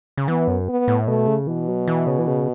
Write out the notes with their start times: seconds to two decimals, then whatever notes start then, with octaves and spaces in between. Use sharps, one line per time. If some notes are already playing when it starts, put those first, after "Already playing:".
0.17 C#3
0.28 E3 B3
0.48 F#2
0.69 B3
0.88 A2
1.07 B2 A3
1.27 C#3
1.47 B2 E3
1.68 F#3
1.88 E3
2.07 C#3
2.19 E3
2.27 C#3